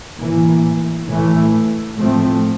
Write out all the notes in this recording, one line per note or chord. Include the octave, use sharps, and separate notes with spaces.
A2 E3 A#3
A2 E3 A3
A2 F3 A3 C4